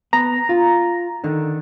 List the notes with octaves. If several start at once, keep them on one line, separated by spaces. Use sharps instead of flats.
B3 A#5
F4
D3 D#3